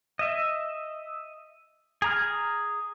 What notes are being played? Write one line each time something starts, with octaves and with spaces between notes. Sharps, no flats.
D#5 E5
G#4 A#5 F6